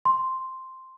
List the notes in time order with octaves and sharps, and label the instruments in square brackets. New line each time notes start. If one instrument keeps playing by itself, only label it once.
[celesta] C6